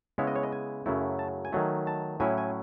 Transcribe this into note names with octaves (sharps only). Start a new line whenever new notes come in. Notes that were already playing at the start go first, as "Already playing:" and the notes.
C#3 G#3 B3 E4 C#5
D#5
C#5
D#5
G#5
F#2 C#3 F#3 A3 E4
A5
G#5
D#3 F#3 A3
A5
A2 F#3 C#4 E4 G#5
G#5